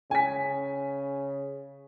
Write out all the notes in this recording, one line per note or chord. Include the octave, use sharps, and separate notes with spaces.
C#3 G#5 B6